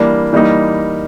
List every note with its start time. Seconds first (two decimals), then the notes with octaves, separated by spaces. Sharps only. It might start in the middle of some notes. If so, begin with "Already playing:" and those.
Already playing: E3 G3 A#3 D4
0.32 E3 G3 A#3 D#4